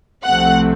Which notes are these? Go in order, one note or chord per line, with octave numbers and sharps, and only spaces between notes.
C2 C3 F3 A3 C4 F#5